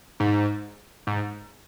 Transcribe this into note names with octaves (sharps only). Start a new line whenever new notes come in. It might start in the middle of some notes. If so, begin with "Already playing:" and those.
G#2
G#2